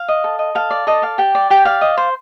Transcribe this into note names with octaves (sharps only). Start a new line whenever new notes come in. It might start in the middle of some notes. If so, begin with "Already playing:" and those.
Already playing: F5
D#5
A4
D#5
A4 F5
D5
A4 D#5
D5 F5
G4 G5
D5
G4 G5
D5 F5
D#5
C5